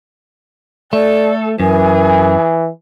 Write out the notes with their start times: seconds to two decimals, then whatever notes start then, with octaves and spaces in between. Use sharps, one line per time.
0.93 A3 A4 D5
1.60 F#2 E3 G#4 A#4